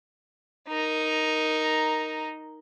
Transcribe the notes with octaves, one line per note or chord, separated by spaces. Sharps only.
D#4 A#4